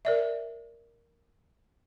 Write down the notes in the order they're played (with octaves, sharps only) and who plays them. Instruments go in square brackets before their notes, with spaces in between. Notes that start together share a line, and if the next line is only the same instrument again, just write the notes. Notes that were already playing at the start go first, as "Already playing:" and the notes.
[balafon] A#4 D5 E5